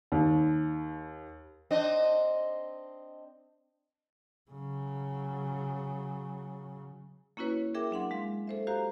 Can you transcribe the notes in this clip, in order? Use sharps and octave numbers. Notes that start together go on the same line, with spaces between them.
D#2
C4 D4 D#5
C#3 F#3
A#3 C#4 E4 F#4 B4 C#5
G#4 A#4 E5 G5 D6
F#3 D4 F#5 C6
G#3 F5 C6
A4 C5 E5
F#4 G4 C5 F5 A#5